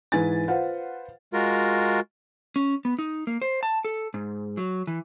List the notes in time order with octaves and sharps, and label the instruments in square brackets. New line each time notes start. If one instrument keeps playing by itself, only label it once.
[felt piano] G#2 E3 B4 G#5 A6
F4 B4 C5 F5 F#5
[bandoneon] G#3 F4 F#4 A#4
[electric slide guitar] C#4
B3
D#4
A#3
C5
A5
A4
G#2
F#3
E3